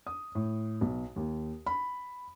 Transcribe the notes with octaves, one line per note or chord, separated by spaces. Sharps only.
D#6
A2
B1
D#2
B5